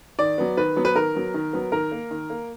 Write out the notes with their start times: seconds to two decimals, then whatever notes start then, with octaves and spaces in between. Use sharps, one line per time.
0.19 D#3 D5
0.38 F#3 B3
0.57 D#3 B4
0.76 F#3 B3
0.85 B4
0.95 D#3 A#4
1.15 F#3 B3
1.34 D#3
1.53 F#3 B3
1.72 D#3 A#4
1.92 A#3
2.11 D#3
2.30 A#3